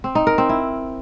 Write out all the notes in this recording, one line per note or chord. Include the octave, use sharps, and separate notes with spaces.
C4
D#4
A#4
C4
E4